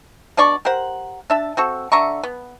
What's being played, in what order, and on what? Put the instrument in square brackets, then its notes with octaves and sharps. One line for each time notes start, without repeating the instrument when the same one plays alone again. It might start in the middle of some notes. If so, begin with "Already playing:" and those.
[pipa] B2 D4 D5 C#6
G4 A#4 C5 F#5
D4 E5 A5
C4 F#4 A4
D3 E5 A#5 C#6
B3